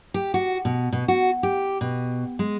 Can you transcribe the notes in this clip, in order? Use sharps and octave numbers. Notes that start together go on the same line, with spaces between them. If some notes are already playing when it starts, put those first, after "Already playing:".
G4
F#4
B2
B2
F#4
G4
B2
G#3